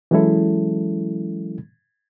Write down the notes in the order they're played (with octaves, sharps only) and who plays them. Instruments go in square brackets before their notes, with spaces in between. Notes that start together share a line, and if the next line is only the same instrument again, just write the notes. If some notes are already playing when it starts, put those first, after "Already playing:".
[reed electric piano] E3 F#3 G#3 C#4 E4 A4